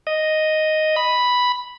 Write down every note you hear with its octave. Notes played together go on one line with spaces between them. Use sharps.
D#5
B5